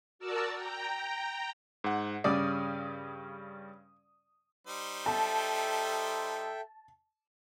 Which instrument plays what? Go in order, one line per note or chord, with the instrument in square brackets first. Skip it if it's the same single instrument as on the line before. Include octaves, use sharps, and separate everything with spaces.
[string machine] F#4 A#4 D5 A5 E6
G5 A#5
[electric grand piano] G#2 F#5
[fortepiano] G2 C#3 D5 [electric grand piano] D#6
[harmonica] G3 D#4 C5
[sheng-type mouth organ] A4 E5 G5 [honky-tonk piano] A5